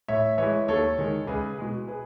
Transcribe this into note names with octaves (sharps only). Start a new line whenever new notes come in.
A2 C#5 E5
E3 G#3 C#5 E5
D#2 A4 C#5
D#3 G#3
C#2 G#4 B4
B2 G#3
G#4 B4